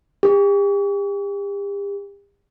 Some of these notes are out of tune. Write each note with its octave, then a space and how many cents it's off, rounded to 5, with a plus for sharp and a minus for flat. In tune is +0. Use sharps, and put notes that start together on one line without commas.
G4 +40